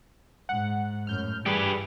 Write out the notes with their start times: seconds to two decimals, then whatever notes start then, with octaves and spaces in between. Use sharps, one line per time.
0.49 G#2 F#5
1.07 F#2 A2 F6 G6
1.46 G2 E3 G3 G4 G#4 B4